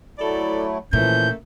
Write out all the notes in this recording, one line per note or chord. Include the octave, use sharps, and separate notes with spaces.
F#3 A3 E4 A4 D5
A#2 E3 F3 A3 A#3 C#4 G6